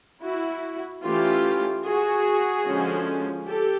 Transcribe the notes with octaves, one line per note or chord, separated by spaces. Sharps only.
E4 F#4
E3 A3 C#4 F4 G4
F#4 G#4
D3 F3 G#3 C#4
G4 A4